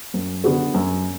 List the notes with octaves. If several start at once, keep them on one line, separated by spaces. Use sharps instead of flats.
F#2
D3 B3 F#4 A4
F#2